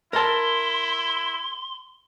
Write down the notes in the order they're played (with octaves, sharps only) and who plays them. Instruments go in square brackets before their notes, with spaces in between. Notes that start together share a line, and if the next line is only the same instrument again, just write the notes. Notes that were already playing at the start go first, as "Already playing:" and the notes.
[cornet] E4 [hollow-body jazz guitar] A#4 A5 [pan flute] C6